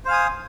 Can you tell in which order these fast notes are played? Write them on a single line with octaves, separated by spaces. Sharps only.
C5 F5 G#5 D#6